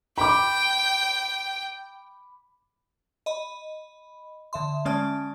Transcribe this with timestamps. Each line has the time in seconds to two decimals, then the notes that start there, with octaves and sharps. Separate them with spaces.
0.18 G5 B5 D6
3.26 D#5 B5
4.53 D3 E5 C6
4.85 G#3 C#4 D5 A5 F6